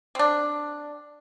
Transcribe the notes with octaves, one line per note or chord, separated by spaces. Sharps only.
C4 D4